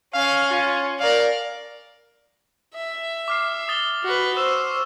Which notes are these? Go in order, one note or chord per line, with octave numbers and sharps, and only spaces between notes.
C#4 F5
F4
A#4 D5 F5
E5
D6 F6 C7
D#6 A6 G7
F#4 B4
C5 C#6 E6 E7